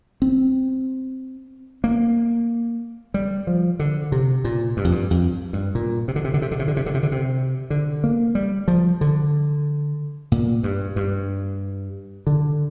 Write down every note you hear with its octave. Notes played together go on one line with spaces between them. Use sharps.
C4
A#3
G3
F3
D3
C3
A#2
G2
F2
G2
F2
G2
A#2
C3
D3
C3
D3
C3
D3
C3
D3
C3
D3
C3
D3
C3
D3
A#3
G3
F3
D3
A#2
G2
G2
D3